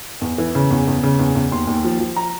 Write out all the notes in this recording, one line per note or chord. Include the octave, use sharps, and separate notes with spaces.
E2
E3
C#3
E2
E2
C#3
E2
E2
D#2 C6
D#2
F3
F3
A#5